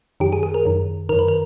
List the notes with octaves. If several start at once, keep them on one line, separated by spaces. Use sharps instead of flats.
F#2 D#3 G4
G#4
G#4
A#4
F#2 D#3
F#2 D#3 A#4
B4
A#4